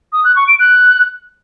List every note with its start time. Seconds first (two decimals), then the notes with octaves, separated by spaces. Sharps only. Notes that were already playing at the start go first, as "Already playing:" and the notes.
0.13 D#6
0.24 F#6
0.36 C#6
0.48 D7
0.59 F#6